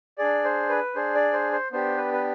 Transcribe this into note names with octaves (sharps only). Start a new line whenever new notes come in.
D4 G#4 D5
C5
B4
D4 G#4 C5
D5
C5
C5
B3 D4 G4 C5
B4
B4